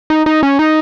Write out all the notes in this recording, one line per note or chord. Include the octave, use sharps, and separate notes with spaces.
D#4
D#4
C#4
D#4